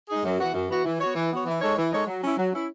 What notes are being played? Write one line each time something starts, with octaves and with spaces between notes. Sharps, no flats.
G#3 D#4 G#4
F#2
E3 B3 F#4
F#2
E3 B3 F#4
E3
B3 F#4 C#5
E3
B3 F#4 C#5
E3
G#3 D#4 A4 C#5
E3
G#3 D#4 A4 C#5
F#3
C#4 E4
F#3
C#4 E4